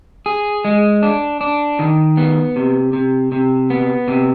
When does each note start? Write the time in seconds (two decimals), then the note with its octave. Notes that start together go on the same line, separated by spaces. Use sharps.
0.26 G#4
0.65 G#3
1.03 D4
1.41 D4
1.79 D#3
2.17 B3
2.56 C3
2.93 C3
3.32 C3
3.70 B3
4.08 C3